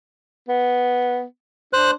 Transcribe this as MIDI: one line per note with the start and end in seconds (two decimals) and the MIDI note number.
0.48 1.23 59
1.73 1.94 62
1.73 1.91 72
1.73 1.91 90